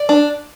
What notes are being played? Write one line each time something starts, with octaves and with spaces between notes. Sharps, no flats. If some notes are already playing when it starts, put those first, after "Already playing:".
Already playing: D5
D4